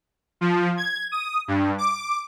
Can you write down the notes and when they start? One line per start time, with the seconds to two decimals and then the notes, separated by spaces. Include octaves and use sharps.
0.41 F3
0.77 G#6
1.12 D#6
1.48 G2
1.78 D6